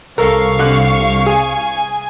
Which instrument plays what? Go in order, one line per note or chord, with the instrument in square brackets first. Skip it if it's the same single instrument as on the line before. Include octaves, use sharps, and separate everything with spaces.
[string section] C2 F5 C#6 [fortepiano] A4 A#4
[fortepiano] D3 F#6
[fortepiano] G#4 [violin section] G#5